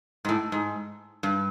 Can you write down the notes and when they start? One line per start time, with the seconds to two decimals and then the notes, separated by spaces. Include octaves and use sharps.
0.25 G#2
0.29 A2
0.52 G#2
1.23 G2